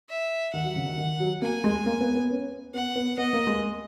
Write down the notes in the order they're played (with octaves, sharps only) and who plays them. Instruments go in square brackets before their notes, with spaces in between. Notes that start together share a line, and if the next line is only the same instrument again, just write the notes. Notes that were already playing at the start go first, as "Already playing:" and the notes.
[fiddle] E5
[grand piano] D#3 [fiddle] F#5
[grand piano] F#3
C#3
D#3
D#3
F#3
[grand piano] A#3 [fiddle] G#5
[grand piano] G#3
A#3
B3
B3
C#4
[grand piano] B3 [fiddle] F#5
[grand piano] B3
[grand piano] B3 [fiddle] D#5
[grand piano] A#3
G#3